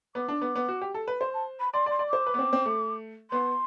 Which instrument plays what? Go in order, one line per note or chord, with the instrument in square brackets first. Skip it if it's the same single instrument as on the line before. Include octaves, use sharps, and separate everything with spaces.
[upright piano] B3 [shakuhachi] D6
[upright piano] D4
B3
B3
F#4
G4
A4
B4
[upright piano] C5 [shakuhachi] C6
[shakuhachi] A5
B5
[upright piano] D5 [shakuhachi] C6
[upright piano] D5
[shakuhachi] C6
[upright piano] D5
[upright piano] C5 [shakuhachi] D6
[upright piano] B4
B3
C4
C4
A3
[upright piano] B3 [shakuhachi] C6